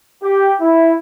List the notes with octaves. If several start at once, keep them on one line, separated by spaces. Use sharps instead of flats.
G4
E4